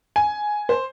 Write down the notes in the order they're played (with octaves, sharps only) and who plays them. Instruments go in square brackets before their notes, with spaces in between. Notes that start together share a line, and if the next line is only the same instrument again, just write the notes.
[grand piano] G#5
[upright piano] C5